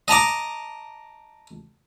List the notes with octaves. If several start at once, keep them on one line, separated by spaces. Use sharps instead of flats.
D#5 A5 A#5 D6